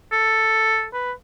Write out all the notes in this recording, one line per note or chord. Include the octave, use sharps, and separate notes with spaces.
A4
B4